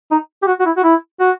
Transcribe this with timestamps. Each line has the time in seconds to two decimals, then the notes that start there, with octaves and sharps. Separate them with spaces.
0.12 D#4
0.43 G4
0.47 F#4
0.60 F#4
0.66 E4
0.77 F#4
0.84 E4
1.20 F#4